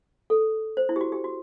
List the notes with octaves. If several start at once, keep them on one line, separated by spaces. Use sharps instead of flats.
A4
C5
E4
G4
F#4
G4
F#4